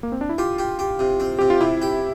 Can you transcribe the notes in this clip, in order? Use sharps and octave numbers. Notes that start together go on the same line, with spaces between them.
A#3
C4
D4
E4
F4 G4
G4
G4
C3
C4
C3 G4
F4
C3 E4
G4